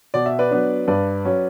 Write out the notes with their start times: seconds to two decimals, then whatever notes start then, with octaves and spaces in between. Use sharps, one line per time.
0.14 B2 D5
0.26 E5
0.39 B4 D5
0.51 F#3 B3 D4
0.88 G2 B4 D5
1.25 F#3 C#4